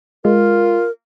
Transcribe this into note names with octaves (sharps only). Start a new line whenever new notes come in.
G#3 F4 A#4